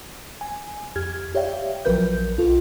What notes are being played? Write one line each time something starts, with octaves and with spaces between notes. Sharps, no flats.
G#5
F2 G4 F6 G#6
G4 C#5 D5 E5 F5 G5
A#1 F3 F#3 A#4 B4 G6
B1 F4 A4